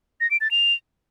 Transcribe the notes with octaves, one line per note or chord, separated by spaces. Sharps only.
A#6
D7
A6
F7